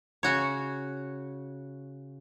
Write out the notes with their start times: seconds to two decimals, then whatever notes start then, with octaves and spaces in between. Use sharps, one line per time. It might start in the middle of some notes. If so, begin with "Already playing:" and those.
0.23 C#3 F#4 C#5